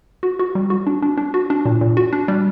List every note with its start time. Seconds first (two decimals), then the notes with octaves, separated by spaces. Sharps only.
0.23 F#4
0.39 F#4
0.55 G3
0.70 F#4
0.87 D4
1.02 D4
1.18 D4
1.34 F#4
1.50 D4
1.65 A#2
1.81 A#2
1.97 F#4
2.13 D4
2.28 G3